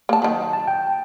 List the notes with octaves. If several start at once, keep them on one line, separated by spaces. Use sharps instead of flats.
A#3 A5
D#3 F#3
A5
G5